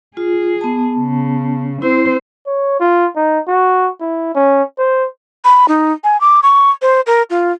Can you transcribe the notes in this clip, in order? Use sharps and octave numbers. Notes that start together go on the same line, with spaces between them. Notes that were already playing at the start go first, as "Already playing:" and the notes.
F4 G#4
B3 A5
C#3
C4 E4 C5
C#5
F4
D#4
F#4
E4
C#4
C5
B5
D#4
G#5
D6
C#6
C5
A#4
F4